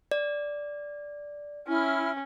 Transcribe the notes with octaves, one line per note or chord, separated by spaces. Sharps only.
D5
C#4 E4 F6